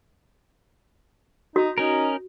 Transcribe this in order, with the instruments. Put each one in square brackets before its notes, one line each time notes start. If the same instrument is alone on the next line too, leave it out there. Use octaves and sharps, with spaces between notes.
[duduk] D#4 [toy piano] F#4
[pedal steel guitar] C#4 A#4 [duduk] D#4